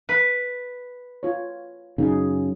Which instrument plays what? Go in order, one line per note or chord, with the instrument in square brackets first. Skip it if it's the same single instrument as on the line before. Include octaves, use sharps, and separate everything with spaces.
[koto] B4
[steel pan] F4 C#5
[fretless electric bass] F#2 C#3 [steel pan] D#4 G#4